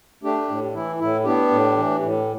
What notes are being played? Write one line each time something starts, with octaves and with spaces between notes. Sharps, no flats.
A3 D4 G4
A2
E3 E4
A2 E4
B3 D4 G4
A2
E3
A2